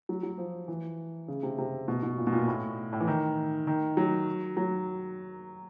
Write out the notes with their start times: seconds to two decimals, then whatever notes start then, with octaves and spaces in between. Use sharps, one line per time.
0.09 F#3
0.23 F#3
0.38 F3
0.68 E3
1.28 C#3
1.43 C3
1.58 C3
1.88 B2
2.03 B2
2.18 A#2
2.27 B2
2.32 A#2
2.48 A2
2.93 A2
3.01 E3
3.08 D#3
3.67 D#3
3.97 F#3
4.57 F#3